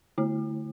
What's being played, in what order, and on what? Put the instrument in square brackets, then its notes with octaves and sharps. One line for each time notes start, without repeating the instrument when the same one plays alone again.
[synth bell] D3 A3 E4